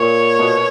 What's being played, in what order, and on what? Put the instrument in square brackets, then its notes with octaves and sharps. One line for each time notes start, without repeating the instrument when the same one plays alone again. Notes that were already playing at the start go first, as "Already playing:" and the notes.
Already playing: [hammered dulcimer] A#2 [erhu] C#5
[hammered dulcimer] B2